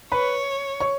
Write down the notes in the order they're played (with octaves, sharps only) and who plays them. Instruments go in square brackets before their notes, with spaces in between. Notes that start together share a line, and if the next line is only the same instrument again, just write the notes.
[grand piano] B4 B5 [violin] C#5
[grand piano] C#5 C#6